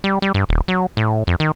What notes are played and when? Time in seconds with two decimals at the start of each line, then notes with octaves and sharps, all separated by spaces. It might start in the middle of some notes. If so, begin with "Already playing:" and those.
0.04 G3
0.22 G3
0.34 G2
0.49 D#1
0.68 F#3
0.97 A2
1.27 F2
1.40 D#3